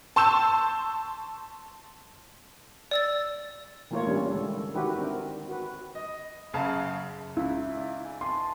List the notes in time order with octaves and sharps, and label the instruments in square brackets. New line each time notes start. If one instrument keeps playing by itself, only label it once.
[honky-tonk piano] A5 C6 C#6 E6 G6 E7
[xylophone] D5 E6 A6
[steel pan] E3 A3 A#3 F4 A#4 C#5
E3 G3 A#3 C#4 D4 F4
D3 G#3 A4
D#3 E4 F#4 G4 A4 B4
C4 D4 A#4
F#4 B4
[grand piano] D#5
F#1 F#2 C#3 F5 A5 A#5
[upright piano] C#2 E4 [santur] E5
[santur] D#4 D5
G#5
[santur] B4 G#5 A5 [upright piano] C6